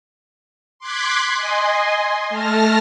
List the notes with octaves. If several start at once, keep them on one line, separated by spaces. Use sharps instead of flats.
C6 D6 F#6 G#6 B6
D#5 G#5 C6
A3 A5 F6 A#6